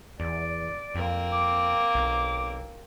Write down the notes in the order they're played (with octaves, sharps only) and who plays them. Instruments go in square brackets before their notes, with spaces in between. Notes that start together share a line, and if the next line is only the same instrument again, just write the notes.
[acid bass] E2 [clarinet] D5
[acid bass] F2 [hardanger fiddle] A#3 C4
[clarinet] D6
[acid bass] B1